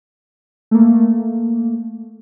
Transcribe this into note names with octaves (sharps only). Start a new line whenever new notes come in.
A3 A#3